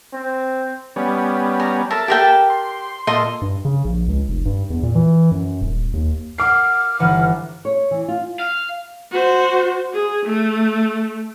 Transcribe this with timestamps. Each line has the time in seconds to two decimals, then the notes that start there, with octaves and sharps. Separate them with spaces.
0.14 C4
0.96 G3 B3 C#4
1.60 A#5
1.91 A4 A#4 E5 A5
2.08 G4 A#4 G5
2.50 C6
3.07 A#2 A4 D#5 C6
3.42 G2
3.65 C#3
3.85 A#1
4.08 C#2
4.28 F1
4.45 G2
4.70 E2
4.83 A#2
4.95 E3
5.32 F#2
5.61 D#1
5.93 D#2
6.38 A#3 F#4 D6 F6 C7
6.99 G1 E3 B4 F#5 G#5
7.65 C#5
7.91 E3
8.08 F4
8.39 F5
9.11 F#4 C5
9.93 G#4
10.26 A3